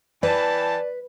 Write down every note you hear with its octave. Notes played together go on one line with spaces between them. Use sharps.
E3 B4 D5 G5 A5